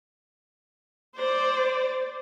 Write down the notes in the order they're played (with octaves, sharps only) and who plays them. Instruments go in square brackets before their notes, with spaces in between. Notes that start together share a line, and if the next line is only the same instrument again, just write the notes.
[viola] C5 D5